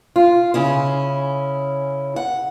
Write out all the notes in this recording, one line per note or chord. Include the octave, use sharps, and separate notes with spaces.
F4
C#3 C#4 E4
F#5